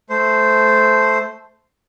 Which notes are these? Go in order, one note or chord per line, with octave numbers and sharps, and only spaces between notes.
A3 C5